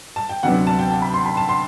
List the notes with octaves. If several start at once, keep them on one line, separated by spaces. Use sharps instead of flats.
A5
G5
D2 C3 F#3 B3 D4 F#5
A5
G5
A5
B5
C6
B5
A5
C6